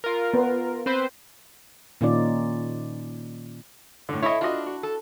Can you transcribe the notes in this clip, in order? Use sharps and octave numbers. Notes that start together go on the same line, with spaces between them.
F4 A#4
B3
C4 B4 C5
A#2 D#3 C#4 D#4 F4 D5
A2 D3
E4 A4 C#5 D#5
D4 F4 F#4 D#5
F#4
A4